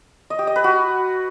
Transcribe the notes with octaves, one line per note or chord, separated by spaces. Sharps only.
D#5
G4
D#5
B4
F#4